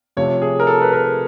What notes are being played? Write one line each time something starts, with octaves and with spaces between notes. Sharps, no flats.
C3 F3 A3 C#5
G#4
A#4
A4
B4
A#4